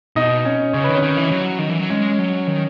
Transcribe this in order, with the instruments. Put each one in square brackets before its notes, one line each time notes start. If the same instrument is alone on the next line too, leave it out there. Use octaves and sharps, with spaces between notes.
[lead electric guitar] B2 [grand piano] D#4 D#5
[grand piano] C#4 C#5
[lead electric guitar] C#3 [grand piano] C#5
[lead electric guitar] D#3 [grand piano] B4
[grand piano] C#4 C#5
[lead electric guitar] D#3
E3
F#3
D#3
E3
F#3
[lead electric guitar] G#3 [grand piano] C#4 C#5
[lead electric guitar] F#3
D#3